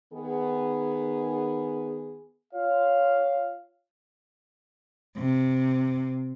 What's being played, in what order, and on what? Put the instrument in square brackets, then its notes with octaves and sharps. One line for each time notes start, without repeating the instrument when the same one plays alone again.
[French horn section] D#3 B3 G#4
[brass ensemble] F4 C#5 F5
[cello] C3